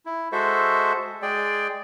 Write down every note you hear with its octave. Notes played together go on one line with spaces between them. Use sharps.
E4
G#3 F#4 A4 C5 E5
G#3 G#4 D5 G5